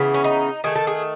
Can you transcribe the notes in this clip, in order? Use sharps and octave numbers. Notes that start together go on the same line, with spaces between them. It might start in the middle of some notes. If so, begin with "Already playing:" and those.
Already playing: C#3 E3 B3
C#4
D#4
D#3 A3 G#4
A4
G#4